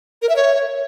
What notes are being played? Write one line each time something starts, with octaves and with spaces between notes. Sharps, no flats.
A#4
E5
C#5